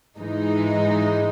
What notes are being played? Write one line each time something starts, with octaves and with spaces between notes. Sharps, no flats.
G#2 E3 G#3 D#4